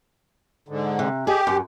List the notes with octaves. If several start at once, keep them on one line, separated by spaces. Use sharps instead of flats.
G#2 D3
C3
G4 G#4 D#5
F#2